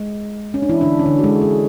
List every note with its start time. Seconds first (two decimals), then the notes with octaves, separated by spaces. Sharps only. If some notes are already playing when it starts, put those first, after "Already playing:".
Already playing: G#3
0.54 C#4
0.62 D4
0.69 E3 E4
0.81 D3 D4
0.99 C#4
1.06 D3 D4
1.19 F#4
1.24 G#3 G#4
1.41 G#3 G#4